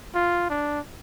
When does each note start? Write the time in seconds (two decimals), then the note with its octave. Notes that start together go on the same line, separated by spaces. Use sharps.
0.15 F4
0.50 D4